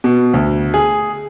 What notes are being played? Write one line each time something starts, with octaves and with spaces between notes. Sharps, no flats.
B2
D2
G#4